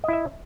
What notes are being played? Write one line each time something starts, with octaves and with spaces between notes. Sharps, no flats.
E4 D#5 E5